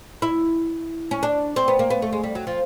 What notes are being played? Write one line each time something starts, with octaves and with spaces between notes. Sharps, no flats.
E4
C#4
D4
C4
B3
A#3
B3
A3
G#3
G3
F#3
F3